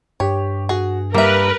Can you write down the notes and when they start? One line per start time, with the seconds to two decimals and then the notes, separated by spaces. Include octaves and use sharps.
0.20 G2 G4 C#5
0.69 F#4 G#4
1.14 G3 A#3 A#4 B4 E5